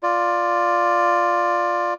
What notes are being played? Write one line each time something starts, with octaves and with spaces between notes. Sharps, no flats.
F4 D5